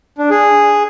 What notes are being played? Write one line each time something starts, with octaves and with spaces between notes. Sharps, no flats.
D4
G#4